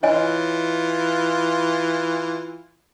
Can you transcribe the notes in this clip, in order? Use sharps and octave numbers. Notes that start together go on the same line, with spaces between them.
E3 F4 C#5 D#5 G#5